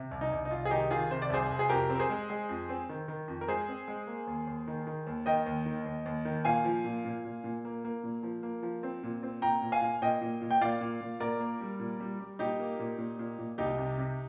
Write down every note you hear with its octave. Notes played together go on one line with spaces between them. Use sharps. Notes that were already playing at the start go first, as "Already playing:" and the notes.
Already playing: C3
C2
D#4
C2
D#4
C2 F4
G#4
D#3 D#4 G4
D#3 F4 G#4
C3 C5
D5
C2 G#4 C5
C2
G#4
F2 G4 A#4
C4
A#4
G#4 C5
G#3
G#3
F2
C4
D#3
D#3
F2
A#4
G#3 G#4 C5
C4
G#3
A#3
D#2
D#2
D#3
D#3
D#2
D#3 D#5 G5
D#2
D#3
D#2
D#2
D#3
A#2 F5 G#5
F3
A#2
A#2
A#2
A#2
A#3
A#3
A#2
F3
A#3
F3
C4
A#2
C4
A#2 G5 A#5
A#2
F5 G#5
A#2
A#2 D#5 G5
A#2
A#2
G5
A#2 D5 F5
A#2
A#2
A#2 A#4 D5
A#3
G3
A#2
G3
G3
A#2 D#4 G4
A#3
A#2
A#2
A#2
A#2
C2 D#4 G4
C3
C3